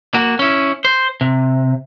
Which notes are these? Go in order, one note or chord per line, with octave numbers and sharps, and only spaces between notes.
A#3 F#4
C#4 E4
C5
C3